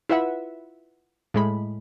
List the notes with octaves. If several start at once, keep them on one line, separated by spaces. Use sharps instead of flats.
E4 F4 B4 E5 F#5
A2 G#3 B5